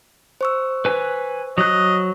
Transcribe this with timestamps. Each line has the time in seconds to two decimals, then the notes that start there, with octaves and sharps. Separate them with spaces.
0.41 C5 C#6 E6
0.85 B4 G#5
1.58 F#3 D#5 F#6